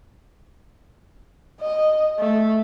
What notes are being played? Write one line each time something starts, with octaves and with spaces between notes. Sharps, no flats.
D#5
A3